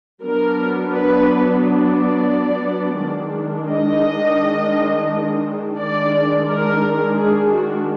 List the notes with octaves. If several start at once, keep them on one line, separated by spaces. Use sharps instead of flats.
F#3 B3 D4 A#4
B4
D5
D#3 G#3 D4
D#5
D#3 G#3 D4 D5
A#4
G#4
F#4